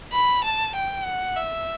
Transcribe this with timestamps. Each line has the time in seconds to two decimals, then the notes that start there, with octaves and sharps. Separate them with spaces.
0.12 B5
0.44 A5
0.75 G5
1.05 F#5
1.36 E5